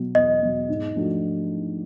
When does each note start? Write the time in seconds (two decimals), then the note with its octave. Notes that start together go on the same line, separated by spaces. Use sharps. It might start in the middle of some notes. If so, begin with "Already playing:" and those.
Already playing: B2 F#3
0.15 E2 D#5
0.42 B2 F#3
0.69 G#2
0.96 F3 A3 D4 F#4